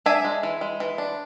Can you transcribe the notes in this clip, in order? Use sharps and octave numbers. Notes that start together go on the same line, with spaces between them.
D4 E5 G#5
G#3
E3
G#3
E3
D4